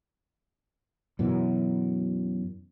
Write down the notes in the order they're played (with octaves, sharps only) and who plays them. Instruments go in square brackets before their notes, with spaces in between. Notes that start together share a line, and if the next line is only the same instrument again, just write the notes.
[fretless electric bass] F#2 B2 E3